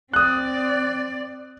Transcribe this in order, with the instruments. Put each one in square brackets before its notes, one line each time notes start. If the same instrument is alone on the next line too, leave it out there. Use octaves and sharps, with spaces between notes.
[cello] C4 D5 [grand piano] D#6 F#6